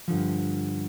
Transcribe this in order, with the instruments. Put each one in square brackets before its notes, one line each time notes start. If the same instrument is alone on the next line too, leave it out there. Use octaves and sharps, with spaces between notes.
[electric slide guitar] G2 D3 F3